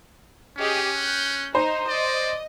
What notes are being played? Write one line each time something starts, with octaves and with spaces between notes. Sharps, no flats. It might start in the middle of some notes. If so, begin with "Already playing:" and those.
C#4 G4 G#4 D#5
F#6 G6
D#4 C5
D5 D#5